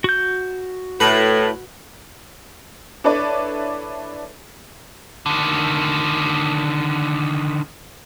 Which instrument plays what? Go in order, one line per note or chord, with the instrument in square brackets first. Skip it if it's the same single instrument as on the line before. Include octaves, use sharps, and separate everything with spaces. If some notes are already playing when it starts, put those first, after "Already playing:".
[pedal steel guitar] F#4 G6
[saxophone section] A2 [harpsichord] B4
[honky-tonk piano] D4 E4 A4 B4 C#5 D5
[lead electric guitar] D3 D#3